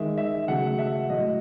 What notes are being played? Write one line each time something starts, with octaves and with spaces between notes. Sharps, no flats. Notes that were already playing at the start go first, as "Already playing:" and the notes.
Already playing: D#3 G#3 E5
E5
C#3 F#3 A3 F#5
E5
A2 F#3 A3 D#5